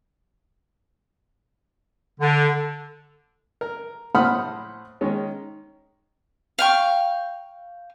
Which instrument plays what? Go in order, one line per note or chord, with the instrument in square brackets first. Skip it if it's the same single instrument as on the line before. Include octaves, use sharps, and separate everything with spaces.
[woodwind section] D3
[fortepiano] A#4
A2 C5 F#5 B5 D#6 F6
D#3 G#3 C#4
[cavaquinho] F5 G5 C#6